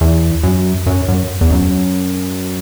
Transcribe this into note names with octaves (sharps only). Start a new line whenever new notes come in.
E2
F#2
F#2
F#2
E2
F#2